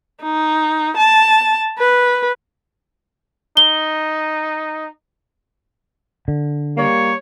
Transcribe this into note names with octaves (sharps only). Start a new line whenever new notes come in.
D#4
A5
B4
D#4 G7
D3
G3 A#3 C#5